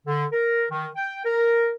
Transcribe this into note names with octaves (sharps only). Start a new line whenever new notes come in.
D3
A#4
D#3
G5
A#4